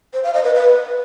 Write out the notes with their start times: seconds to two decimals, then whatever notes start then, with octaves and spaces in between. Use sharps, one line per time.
0.13 C5
0.24 F5
0.34 D#5
0.44 B4
0.54 B4